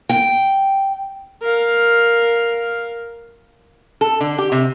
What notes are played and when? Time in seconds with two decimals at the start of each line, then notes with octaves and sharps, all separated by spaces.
0.09 G5
1.42 A#4 F5
4.01 A4
4.21 D3
4.38 G4
4.52 C3